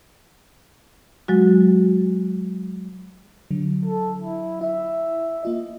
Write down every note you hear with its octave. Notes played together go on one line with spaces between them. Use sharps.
F#3 G#3 F#4
D3 F#3
A4
E4
E4 E5
A#3 F4 D#5